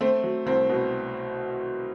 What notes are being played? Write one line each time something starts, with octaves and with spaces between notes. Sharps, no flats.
A3 C4
F#3
C2 C4
B2